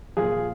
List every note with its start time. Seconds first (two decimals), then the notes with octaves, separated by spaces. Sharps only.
0.17 A#2 F3 F4 G#4